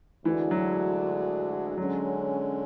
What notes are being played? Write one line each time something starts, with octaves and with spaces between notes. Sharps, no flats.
D2 D3 E3 G#3 D4 F#4
F#3
D3 F#3 G#3 C#4